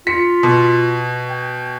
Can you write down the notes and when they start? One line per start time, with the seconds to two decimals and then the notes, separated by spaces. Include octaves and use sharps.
0.07 F4 B6 C#7
0.43 B2
1.30 G5